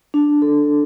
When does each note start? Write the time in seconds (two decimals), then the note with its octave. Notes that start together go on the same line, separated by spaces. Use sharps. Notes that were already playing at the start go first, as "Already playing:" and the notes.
0.14 D4
0.42 A4